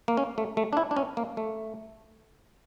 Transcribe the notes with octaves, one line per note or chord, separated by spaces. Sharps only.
A#3
C#4
A3
A3
D4
E4
D4
C#4
A#3
A3